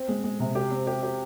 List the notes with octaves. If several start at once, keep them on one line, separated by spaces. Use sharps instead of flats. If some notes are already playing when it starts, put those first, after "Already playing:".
Already playing: C4
G#3
G#3
C3
G4
C4
G4
G4